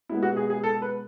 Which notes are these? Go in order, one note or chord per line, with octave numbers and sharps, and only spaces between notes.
B2 G#3 B3 E4
F#4
G#4
G#4
A4
B4